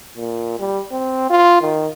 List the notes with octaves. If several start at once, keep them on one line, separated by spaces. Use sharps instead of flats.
A#2
G3
C4
F4
D#3